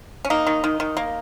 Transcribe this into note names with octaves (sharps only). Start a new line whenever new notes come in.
C#4
A#3 D#4
D#3
D#3
D#3
A#3